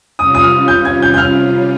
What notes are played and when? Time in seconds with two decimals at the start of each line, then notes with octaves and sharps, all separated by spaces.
0.18 C3 G3 C#4 F4 D#6
0.35 D#6
0.43 F6
0.68 G6
0.85 G#6
1.02 G6
1.14 G6
1.18 F6